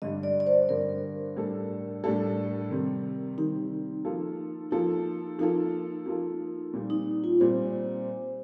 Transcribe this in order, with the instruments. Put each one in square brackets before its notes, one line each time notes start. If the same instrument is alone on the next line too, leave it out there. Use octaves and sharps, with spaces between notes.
[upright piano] G2 D3 G3 [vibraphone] D#5
[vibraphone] D5
D5
C5
[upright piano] G2 D3 G3 [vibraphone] A#4
[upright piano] A2 G3 D4 A4
A2 G3 D4 A4
C3 D#3 G3 C4
[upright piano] C3 D#3 G3 C4 [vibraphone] D#4
[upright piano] F3 A#3 F4 A4
[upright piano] F3 A#3 F4 A4 [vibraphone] D#4
[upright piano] F3 A#3 F4 A4 [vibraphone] D#4
[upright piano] F3 A#3 F4 A4
A#2 G3 C4
[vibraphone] D#4
F4
[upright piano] A#2 G3 C4 [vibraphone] C5